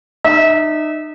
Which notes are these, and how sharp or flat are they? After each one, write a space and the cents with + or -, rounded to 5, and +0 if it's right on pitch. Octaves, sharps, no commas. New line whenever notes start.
D#4 -35 E5 -30